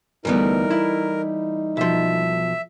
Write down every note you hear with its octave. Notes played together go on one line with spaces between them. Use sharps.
D2 E3 G3 A3 B3 D#4 A#4
E4
B1 F3 E5